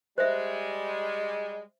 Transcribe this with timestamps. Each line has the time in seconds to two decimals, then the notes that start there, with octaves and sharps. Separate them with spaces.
0.18 G3 G#3 C5 E5